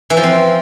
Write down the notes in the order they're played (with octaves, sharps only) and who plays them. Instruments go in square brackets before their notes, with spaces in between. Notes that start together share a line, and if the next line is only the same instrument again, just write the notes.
[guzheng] E3
F3
C4